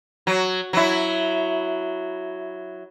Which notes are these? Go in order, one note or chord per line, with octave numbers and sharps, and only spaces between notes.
F#3
F#3 E4